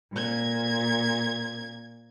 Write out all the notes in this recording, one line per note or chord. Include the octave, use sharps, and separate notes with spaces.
A#2 G#6